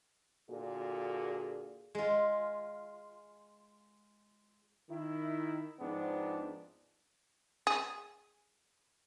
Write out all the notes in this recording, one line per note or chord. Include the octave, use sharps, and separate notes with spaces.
A#2 D3 F#4 G#4
G#3 F4
D#3 E4
G#2 F3 B3 C4 D4
G#4